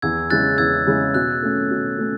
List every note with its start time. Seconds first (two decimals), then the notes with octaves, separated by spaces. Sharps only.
0.02 E2 E6 G#6
0.30 C#3 G#3 C#4 E4 F#6 A6
0.58 E2 E6 G#6
0.87 C#3 G#3 C#4 E4
1.14 B2 F#6
1.42 A3 C#4
1.71 B2
1.98 A3 C#4